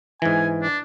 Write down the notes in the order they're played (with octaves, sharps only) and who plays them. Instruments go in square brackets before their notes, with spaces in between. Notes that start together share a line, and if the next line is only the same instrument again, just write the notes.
[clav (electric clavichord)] G#2 E3 [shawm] G#5
[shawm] D4